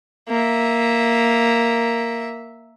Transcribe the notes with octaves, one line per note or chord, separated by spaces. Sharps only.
A#3 E5